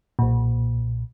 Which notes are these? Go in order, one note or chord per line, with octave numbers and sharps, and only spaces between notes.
B1 A#2